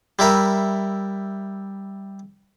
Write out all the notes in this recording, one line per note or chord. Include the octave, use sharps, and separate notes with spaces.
G3 E4 A#4 E5